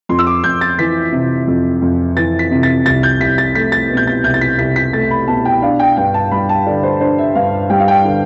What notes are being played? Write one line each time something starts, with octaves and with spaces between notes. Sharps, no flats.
F2 C6
E6
D6
F2 G6
A6
E3 B6
C3
F2
F2
E3 A6
B6
C3
A6
C2 A6
G6
C2 B6
A6
A3 B6
A6
B2
G6
A6
C2 G6
A6
B6
C2 B6
B6
A3 A6
B5
B2 A5
G5
D4 F5
G5
G2 G5
A5
G3 B5
A5
D3 D5
C5
D4 C5
E5
G2 F5
G3 G5
F5
G5
D3